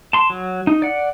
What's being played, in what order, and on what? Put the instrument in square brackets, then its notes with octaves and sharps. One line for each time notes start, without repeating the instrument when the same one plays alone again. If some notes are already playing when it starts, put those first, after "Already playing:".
[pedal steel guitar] A5 C6
F#3
D#4
D5 F#5